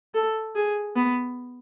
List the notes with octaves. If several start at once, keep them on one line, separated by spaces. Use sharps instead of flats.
A4
G#4
B3